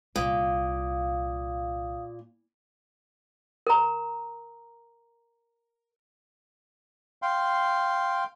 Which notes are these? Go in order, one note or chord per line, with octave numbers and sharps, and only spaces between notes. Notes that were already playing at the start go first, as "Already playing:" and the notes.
C2 A#2 A#3 F5 D#6
A#4 A#5
F5 G5 C6